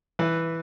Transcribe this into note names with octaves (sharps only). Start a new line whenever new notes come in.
E3 B4